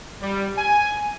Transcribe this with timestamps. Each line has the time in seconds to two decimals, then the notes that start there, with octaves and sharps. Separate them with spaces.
0.21 G3
0.56 G#5